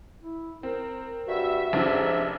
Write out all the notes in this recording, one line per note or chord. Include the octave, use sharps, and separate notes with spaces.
E4
C4 A#4
G2 F#4 E5
F1 G#2 C#4 D4 E4